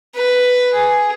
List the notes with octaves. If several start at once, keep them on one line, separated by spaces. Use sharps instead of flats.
B4
G#4